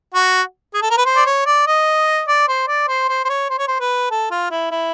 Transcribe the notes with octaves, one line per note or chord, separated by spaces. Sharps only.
F#4
G#4
A4
A#4
B4
C5
D5
C#5
D5
D#5
D5
C5
D5
C5
C5
C5
C#5
C5
C#5
C5
B4
A4
F4
E4
E4